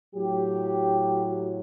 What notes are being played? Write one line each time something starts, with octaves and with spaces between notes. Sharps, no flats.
A2 F#3 G4